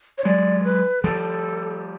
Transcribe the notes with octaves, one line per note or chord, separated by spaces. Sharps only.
C#5
F#3 G#3 D5
B4
F3 G3 A4